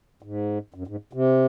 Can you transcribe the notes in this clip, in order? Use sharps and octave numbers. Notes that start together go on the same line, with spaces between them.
G#2
F#2
G#2
C3